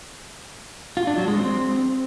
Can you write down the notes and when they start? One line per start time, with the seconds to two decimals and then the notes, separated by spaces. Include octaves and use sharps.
0.97 F4
1.07 D4
1.18 F#3
1.28 G#3
1.38 C4